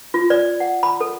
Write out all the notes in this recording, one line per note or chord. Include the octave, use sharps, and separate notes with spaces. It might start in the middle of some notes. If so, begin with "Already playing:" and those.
F4
D5
F#5
B5
A4